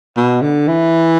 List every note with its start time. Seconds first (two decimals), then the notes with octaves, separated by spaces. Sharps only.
0.17 B2
0.42 D3
0.68 E3